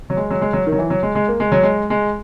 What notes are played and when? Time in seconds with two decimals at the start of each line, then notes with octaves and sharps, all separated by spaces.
0.10 F#3
0.17 G#3
0.31 F#3
0.41 G#3
0.53 F#3
0.67 D#3
0.72 F#3
0.79 E3
0.90 F#3
1.03 G#3
1.15 G#3
1.28 A#3
1.40 G#3
1.52 F#3
1.63 G#3
1.90 G#3